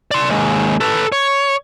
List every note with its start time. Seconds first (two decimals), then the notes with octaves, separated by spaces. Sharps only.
0.11 D5 C6
0.28 D#2 G#3
0.80 A4 B4
1.12 C#5